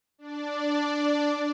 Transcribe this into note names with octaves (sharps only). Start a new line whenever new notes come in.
D4 D5